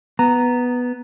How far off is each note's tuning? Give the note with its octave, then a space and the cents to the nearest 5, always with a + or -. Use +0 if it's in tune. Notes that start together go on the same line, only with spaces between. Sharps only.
B3 +0 A#5 -5